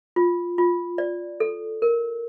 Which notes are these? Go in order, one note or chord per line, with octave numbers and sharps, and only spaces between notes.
F4
F4
D5
A4
A#4